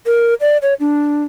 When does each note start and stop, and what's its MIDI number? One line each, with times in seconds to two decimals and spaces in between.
0.06 0.34 70
0.41 0.57 74
0.62 0.74 73
0.80 1.24 62